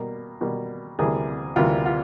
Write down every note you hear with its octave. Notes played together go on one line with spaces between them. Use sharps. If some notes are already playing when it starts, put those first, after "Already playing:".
Already playing: B2 G3 A#3
B2 G3 A#3
D2 C3 E3 G3 A#3 G#4
D2 C3 E3 G3 A#3 F4
F4